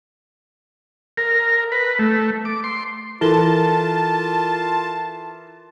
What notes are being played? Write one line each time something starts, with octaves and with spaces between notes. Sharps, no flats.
A#4
B4
A3
D6
C6
E3 E4 F4 A4 A#4 A5 G7